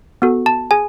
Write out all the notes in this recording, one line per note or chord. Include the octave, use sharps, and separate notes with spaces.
B3 F#4 A4
A5
G#4 G#5